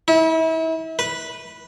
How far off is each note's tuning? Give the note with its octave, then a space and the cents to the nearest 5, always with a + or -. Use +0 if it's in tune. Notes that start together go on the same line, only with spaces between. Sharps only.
E4 -35
B4 -10